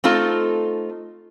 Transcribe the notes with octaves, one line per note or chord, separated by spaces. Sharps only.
A3 C4 D#4 F4 A4